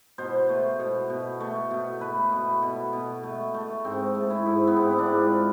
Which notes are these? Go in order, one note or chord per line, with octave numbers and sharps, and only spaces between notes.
B2 C5
A3
B2
B2
A3
B2
A3 B4
B2
B2
B2
A3
A3
G#2 C4
A3
E4
G#2
B3
G#2 C4
E4
D4
G#2
F4